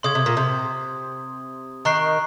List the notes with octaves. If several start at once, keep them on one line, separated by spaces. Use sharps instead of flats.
C#3 C6 D#6 G#6
C3
A#2
C3
D#3 A#5 C#6 F#6 C7